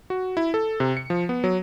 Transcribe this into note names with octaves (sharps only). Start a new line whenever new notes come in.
F#4
E4
A4
C3
C#7
F3
B3
F#3